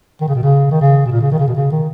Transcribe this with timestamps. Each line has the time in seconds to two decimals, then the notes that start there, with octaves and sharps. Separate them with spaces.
0.21 D#3
0.28 C#3
0.35 B2
0.43 C#3
0.71 D#3
0.81 C#3
1.05 B2
1.11 A#2
1.21 C#3
1.31 D#3
1.39 C#3
1.48 B2
1.56 C#3
1.72 D#3